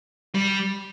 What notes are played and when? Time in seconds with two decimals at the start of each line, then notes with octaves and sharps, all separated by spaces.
0.35 G3